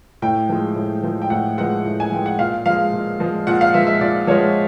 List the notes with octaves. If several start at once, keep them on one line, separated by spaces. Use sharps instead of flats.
A2 G5
F3 G#3
A2
F3 G#3
G5
A2 F#5
F3 G#3 F#5
A2
G#5
F3 G#3 G5
F#5
A#2 F5
F3 G#3 F5
A#2
F3 G#3
A#2 F#5
F5
F3 G#3 E5
E5
A#2 D5
F3 G#3 C#5